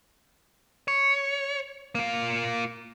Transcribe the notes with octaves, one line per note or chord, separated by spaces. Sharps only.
C#5
A#3 F4